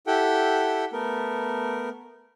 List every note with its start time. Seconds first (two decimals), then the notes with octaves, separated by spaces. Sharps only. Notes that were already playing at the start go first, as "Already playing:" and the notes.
0.07 E4 G4 A4 F#5 G5
0.93 A3 B3 A#4